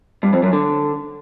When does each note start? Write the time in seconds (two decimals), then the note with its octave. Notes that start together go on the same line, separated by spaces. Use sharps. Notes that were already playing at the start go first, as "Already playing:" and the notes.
0.23 G2
0.33 F2
0.43 F#2
0.53 D3